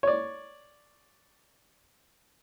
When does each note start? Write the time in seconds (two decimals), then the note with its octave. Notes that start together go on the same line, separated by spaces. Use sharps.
0.03 C#5 D5